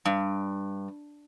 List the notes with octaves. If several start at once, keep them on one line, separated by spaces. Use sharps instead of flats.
G2